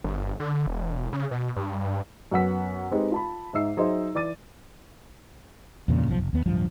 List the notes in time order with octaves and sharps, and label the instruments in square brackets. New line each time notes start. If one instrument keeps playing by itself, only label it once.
[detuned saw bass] G1
D3
E1
C#3
B2
G2
[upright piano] F#2 F#3 B3 F#5 E6 B6
G#3 C4 D#4 G4 B4
F4 A5 B5
G#2 D#4 E5 E6 C7
F#3 D#4 G#4 C5 D#5 E5
E3 D5 D6 A6 D#7
[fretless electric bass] E2 G2 A#2 C#3
F#1 B1 D3 F3
F1
D#2 B3
D1 G2 F3